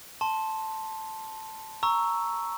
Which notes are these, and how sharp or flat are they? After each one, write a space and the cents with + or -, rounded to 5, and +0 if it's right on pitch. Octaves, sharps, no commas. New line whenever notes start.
A5 +0 C6 +15
A#5 +0 C#6 +0 E6 +0